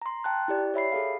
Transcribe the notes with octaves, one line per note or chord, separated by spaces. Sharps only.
A#5 C6
G5 A5 F#6
E4 G4 D5
C#5 E5 B5 C7
G#4 A4 F5